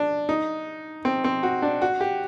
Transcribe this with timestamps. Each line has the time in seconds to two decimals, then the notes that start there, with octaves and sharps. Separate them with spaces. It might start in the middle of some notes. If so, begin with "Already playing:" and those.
Already playing: D4
0.29 D#4
1.05 C4
1.24 C4
1.43 F#4
1.62 D4
1.82 F#4
2.01 G4